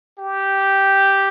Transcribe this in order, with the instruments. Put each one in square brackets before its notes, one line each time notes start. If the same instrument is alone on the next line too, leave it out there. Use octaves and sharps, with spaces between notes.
[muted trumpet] G4